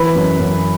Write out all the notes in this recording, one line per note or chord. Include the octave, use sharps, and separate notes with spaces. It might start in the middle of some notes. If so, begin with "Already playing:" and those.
Already playing: E3 B4 B5
F#2
F#2